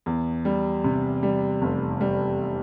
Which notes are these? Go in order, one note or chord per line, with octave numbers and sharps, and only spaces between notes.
E2
G3
C3
G3
F1
G3